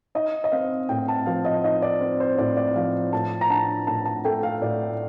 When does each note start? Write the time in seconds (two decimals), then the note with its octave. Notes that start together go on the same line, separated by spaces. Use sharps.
0.15 D#4 D#5
0.44 D#5
0.52 C4 F5
0.89 A2 G5
1.08 A5
1.26 F3 F5
1.45 D#5
1.64 D#4 D#5
1.82 D5
2.01 C4
2.20 C5
2.38 A2 D5
2.57 D5
2.76 F3 F5
3.13 A2 A5
3.41 A#5
3.49 D4 A5
3.87 A2 A5
4.05 A5
4.25 A3 G5
4.43 F5
4.61 A2 D5